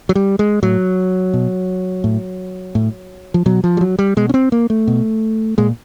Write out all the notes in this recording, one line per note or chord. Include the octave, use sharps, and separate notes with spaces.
F#3
G3
G#3
A2 F#3
B2
A2
A2
F3
B2 F#3
F3
G3
F#3
G3
B2 G#3
C#4
C4
A#3
A3
B2
A#2 G#3